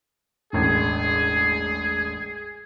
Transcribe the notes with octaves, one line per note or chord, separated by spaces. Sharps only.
E1 A1 G#4